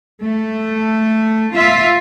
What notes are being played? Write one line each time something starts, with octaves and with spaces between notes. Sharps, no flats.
A3
F4 E5